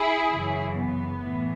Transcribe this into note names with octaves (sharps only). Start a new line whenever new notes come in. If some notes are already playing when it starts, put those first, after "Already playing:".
Already playing: E4 G#4
F#2 C#3 E3
B3
A2 E3